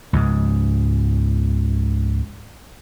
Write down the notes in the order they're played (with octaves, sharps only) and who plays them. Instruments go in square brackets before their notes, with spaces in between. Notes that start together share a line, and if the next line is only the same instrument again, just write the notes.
[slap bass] C#2 G#2